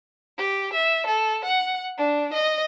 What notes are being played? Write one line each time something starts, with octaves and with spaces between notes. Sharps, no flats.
G4
E5
A4
F#5
D4
D#5